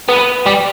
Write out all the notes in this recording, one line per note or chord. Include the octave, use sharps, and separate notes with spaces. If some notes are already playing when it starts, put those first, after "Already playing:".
B3
G3